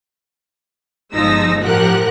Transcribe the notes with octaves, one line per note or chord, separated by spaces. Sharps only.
G1 F3 G#3 D#4 E6 A#6
A2 F3 G4 A#4 F#5 F#6